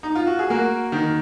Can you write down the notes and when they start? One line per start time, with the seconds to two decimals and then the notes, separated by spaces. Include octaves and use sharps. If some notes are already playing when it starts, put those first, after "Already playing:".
0.03 D#4
0.15 F4
0.27 F#4
0.39 G#4
0.50 A#3 F#4 A#4
0.92 D#3